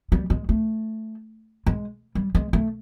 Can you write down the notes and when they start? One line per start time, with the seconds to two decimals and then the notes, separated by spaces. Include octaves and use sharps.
0.12 G3
0.30 G#3
0.49 A3
1.66 G#3
2.15 G3
2.35 G#3
2.53 A3